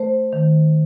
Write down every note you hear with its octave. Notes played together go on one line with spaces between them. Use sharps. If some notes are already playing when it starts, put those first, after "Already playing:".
Already playing: A3 C5
D#3